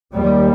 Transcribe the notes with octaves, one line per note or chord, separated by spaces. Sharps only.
D#2 G3